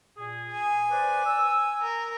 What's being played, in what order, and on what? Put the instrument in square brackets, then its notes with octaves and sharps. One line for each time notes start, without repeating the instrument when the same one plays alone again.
[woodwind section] A#2 G#4
[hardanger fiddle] G#5
[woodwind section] B4 C5 D5
E6
[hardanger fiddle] A#4